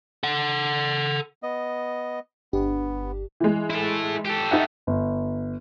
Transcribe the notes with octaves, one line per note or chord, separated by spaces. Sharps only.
A4 F#5
B3 D#5
G1 B3 D4 G4
E3 G#3
E4 A4
G4 A4
D#4 E5 F#5
G1